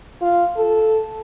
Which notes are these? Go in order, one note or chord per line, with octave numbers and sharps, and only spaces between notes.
F4
A4